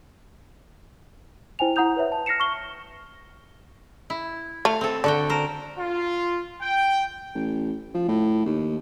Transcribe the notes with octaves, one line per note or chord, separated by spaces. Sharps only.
E4 C5 G5 G#5 F7
E4 F#5 A#5 D#6 G6 F7
B4 C#5 E5
A5
F6 A#6 C7 C#7 E7
C#6 F6 G7
E4
A3 F5
C4 A4
D3 D4 F#4 G5
A#4 C5
F4
G5
A1
F3
A2
D#2